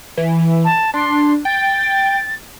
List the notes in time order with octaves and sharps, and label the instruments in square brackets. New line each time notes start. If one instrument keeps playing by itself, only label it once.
[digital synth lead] E3
[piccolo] A5
[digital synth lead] D4 [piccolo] C6
[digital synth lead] G5 [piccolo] A6